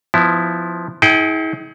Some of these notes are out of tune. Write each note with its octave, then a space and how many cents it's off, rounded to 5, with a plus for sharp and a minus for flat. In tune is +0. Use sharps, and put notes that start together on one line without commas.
F3 +0 B3 +20 E4 +0
E4 -45 G#4 +20 G5 -15